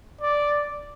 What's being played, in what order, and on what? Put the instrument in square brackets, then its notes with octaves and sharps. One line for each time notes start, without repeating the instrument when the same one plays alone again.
[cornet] D5